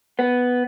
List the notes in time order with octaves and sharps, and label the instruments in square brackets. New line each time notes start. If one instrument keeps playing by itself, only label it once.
[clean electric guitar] B3